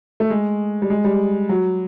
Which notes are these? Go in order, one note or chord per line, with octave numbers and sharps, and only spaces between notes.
A3
G#3
G3
G#3
G3
F#3